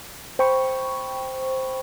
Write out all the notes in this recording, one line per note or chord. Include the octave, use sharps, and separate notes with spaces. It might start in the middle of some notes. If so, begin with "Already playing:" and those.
C5 G5 B5 C#6